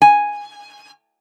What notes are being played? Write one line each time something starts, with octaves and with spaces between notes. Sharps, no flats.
G#5